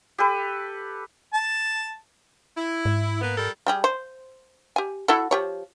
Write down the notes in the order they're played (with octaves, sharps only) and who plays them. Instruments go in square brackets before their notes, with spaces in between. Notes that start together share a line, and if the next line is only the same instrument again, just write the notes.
[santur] G4 A4 B4
[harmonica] A5
[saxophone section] E4
[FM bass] G#2
[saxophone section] A#3 B3
G3 A4 A#4
[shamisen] G3 G4 G#4
C5
G4 G#5
E4 F#4 A4
F3 G4 C#5